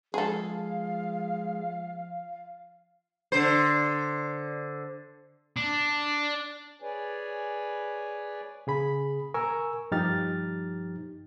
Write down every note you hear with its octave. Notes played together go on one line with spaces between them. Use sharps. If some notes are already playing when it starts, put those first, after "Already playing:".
F3 G#3 G#4 A4 F5
D3 C5
D4
G#4 B4 C#5 D5 G#5
C#3 G#4 B5
A#4 G#5 C#6 E6
G2 F3 D#4 G4 F6 A6